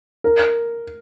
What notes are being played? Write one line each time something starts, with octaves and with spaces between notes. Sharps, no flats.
A#4